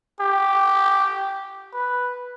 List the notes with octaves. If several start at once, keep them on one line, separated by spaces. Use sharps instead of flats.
G4
B4